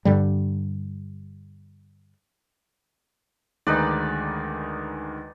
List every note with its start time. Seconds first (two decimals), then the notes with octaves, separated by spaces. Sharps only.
0.05 G2 D3 G3
3.67 D2 D#3 G#3 D#4 B4 D5